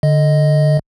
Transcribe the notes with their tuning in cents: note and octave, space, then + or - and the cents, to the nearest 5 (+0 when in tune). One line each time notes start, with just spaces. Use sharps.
D3 +5 D#5 +0